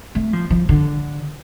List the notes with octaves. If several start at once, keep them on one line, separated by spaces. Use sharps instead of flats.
A3
F3
F3
D3